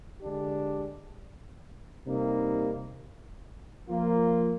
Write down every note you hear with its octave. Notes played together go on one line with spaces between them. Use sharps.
D3 G#3 D4 G4
C3 G3 A#3 D#4
F3 A#3 F4